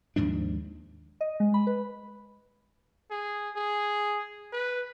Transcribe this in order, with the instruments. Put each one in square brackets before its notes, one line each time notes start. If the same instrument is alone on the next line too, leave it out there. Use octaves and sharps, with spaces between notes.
[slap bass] D#2 G#2 F3 D4
[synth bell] D#5
G#3
B5
B4
[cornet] G#4
G#4
B4